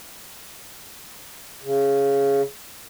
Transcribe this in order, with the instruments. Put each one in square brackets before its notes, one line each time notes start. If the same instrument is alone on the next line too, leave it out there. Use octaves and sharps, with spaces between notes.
[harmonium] C#3